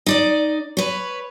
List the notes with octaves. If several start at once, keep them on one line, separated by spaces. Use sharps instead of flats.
D#4 D5 D#5
B4 C#5